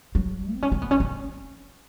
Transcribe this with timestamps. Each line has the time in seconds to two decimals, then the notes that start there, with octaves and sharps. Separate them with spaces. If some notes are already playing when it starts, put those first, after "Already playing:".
0.15 F#3
0.53 C4
0.62 C#4
0.72 C4
0.82 B3
0.91 C#4
1.00 C4